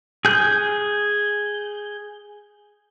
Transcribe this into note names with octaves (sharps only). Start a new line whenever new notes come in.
G#4 G6